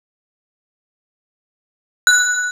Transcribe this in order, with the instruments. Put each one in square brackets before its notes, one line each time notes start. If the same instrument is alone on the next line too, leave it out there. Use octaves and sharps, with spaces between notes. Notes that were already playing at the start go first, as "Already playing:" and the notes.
[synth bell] F#6